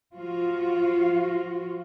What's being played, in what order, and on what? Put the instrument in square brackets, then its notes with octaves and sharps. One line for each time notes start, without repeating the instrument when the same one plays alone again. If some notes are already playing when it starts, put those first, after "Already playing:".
[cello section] F3 F4 F#4